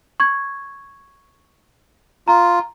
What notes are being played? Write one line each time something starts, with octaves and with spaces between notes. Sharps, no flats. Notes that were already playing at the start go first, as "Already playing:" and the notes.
C#6 G#6
F4 A#5